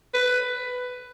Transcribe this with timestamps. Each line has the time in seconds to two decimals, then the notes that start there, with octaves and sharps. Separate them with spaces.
0.14 B4